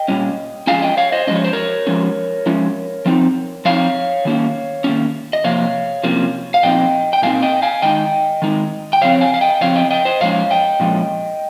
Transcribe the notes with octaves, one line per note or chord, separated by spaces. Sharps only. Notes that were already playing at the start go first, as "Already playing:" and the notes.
Already playing: D#5 G5
A#2 G3 C#4
F3 G#3 C#4 F5 G#5
D#5 G5
C#5 F5
C5 D#5
F3 G#3 C#4 D#5
C#5
C5
A#4 C#5
F3 G#3 C#4
F3 G#3 C#4
F3 C4 D#4
F3 C4 D#4 C#5 F5
D#3 A#3 C#4
D#3 A#3 C#4
D#5
C3 F3 A#3 C#5 F5
C3 F3 A#3 C#4
F5
A#2 F3 C4 D#4 D#5 G5
G5
A#2 F3 C4 D#4 F5 G#5
D#5 G5
F5 G#5
D#3 G#3 D#4 D#5 G5
D#3 G#3 D#4
G5
C#3 F3 C4 C#5 F5
F5 G#5
F5
D#5 G5
C#3 F3 C4 C#5 F5
D#5 G5
D#5 G5
C5 D#5
A#2 F3 G#3 C#4 C#5 F5
D#5 G5
A#2 F3 G#3 C#4